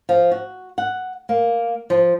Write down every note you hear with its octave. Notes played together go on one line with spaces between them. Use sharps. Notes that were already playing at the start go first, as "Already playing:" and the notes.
F3
F#4
F#5
A#3
F3